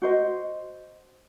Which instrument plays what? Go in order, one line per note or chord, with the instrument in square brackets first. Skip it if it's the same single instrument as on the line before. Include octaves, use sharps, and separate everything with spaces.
[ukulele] F#4 C5 D#5